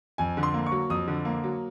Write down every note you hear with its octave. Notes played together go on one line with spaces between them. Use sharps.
F2 G#5
D3
C6
A#3
C#6
F#3
F2 D#6
D3
A#3
F#3